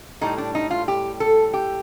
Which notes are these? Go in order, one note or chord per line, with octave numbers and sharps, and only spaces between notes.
A2 G3 D#4
D4
D#4
F4
G4
A4
G4